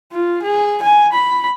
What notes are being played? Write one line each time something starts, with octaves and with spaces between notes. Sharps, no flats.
F4
G#4
G#5
B5